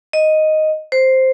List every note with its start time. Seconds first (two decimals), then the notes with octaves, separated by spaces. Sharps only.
0.13 D#5
0.92 C5